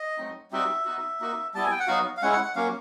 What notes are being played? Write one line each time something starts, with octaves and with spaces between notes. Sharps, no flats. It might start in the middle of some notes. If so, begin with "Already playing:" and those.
Already playing: D#5
F#3 A3 C4 D#4
G3 C4 D#4 F#4 E5
B3 D#4 F#4
A#3 D#4 F#4
G3 B3 E4 A5
G#5
G5
F#5
F#3 B3 D#4 F#4 F5
F5
G#3 C#4 E4 F#5
F#5
F#5
F#3 A#3 C#4 F5